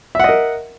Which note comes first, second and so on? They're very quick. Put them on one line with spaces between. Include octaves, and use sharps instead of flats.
E5 F#5 D#5 A#4